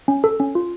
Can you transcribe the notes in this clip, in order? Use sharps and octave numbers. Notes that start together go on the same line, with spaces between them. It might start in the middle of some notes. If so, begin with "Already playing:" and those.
C#4
A4
C#4
F4